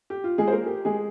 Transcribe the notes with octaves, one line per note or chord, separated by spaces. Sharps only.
G4
F4
G#3 G#4
C5
A#3 A#4
G4
G#3 G#4